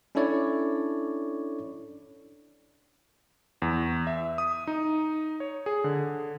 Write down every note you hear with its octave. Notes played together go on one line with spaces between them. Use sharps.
C#4 D4 E4 A4 C#5 D5
E2
E5
D#6
D#4
C#5
G#4
D3